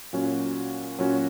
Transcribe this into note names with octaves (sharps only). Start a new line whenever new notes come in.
A#2 F#3 C#4 F#4
A#2 F#3 C#4 F#4